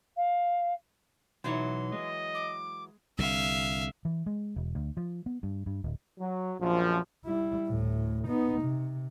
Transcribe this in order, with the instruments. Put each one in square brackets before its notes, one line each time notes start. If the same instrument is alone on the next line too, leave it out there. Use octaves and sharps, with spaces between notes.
[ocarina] F5
[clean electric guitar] B1 D#4 C#5 [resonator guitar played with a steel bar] E3 F#3 [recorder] C6
[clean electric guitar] G#3 [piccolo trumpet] D#5
[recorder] D6
[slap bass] C2 D3 [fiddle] E5 F5
[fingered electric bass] E3
G#3
E1
D2
F3
B3
G2
G2
D1
[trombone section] F#3
A#1 F#2 F3
[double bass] G3 E4
D2 A2
B3 D#4
C3